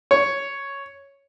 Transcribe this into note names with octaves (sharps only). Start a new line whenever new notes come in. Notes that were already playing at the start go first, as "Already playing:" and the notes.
C#5